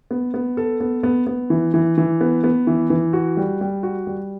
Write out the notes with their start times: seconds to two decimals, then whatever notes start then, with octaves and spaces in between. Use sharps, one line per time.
0.11 B3
0.34 B3
0.57 A4
0.80 B3
1.03 B3
1.27 B3
1.50 E3
1.74 E3
1.98 E3
2.21 B3
2.44 B3
2.67 E3
2.90 E3
3.13 F#4
3.37 G3
3.61 G3
3.83 F#4
4.07 G3